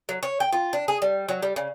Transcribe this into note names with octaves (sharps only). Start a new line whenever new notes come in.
F#3
C#5
G5
F4
D4
G#4
G3
F#3
G3
C#3